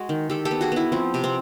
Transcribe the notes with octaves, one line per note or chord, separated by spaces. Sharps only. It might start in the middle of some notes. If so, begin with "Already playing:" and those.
Already playing: G#3 F#4 G#4
D#3
D#3 G4 A4
G4 A4
B3
F#4 G#4
B3 E4 F#4
F3 C4
C3
C4